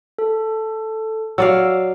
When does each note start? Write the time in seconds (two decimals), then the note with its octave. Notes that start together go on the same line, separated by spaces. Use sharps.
0.18 A4
1.38 F#3 D5 F5 E6